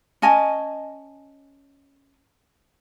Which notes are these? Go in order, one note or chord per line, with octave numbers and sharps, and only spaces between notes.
C#4 D#5 G#5 A5